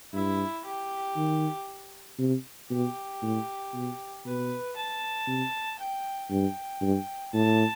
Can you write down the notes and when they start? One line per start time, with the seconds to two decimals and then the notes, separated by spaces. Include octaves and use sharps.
0.13 G2 E4
0.65 G4
1.17 D#3
2.19 C3
2.70 B2 G4
3.22 A2
3.74 B2
4.25 B2 B4
4.76 A5
5.28 C3
5.79 G5
6.30 G2 G5
6.82 G2
7.33 A2 A5